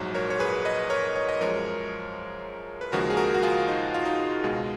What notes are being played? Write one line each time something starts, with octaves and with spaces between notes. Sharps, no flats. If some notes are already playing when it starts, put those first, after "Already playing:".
Already playing: A#1 G#2 F#3
A#4 C#5
C#5
G#4 B4
B4 D#5
A#4 C#5
C#5
D#5
F#2 F3 G#3 A#4 C#5
B4
D#2 C#3 F3 G#3 F#4 A#4
G#4
F#4 A#4
F#4
F4 G#4
D#4
F4
D#4
C#2 B2 G#3